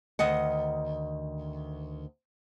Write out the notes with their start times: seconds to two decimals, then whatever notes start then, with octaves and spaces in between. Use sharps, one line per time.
0.19 D2 D#3 D#5 F#5